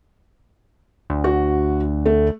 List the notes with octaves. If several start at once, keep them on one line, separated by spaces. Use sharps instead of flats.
D2
F#4
A3